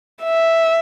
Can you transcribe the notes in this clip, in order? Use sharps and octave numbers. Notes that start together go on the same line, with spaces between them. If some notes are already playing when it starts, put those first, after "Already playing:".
E5